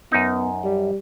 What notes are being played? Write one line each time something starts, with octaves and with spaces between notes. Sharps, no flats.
F#2 B3 D#4
G3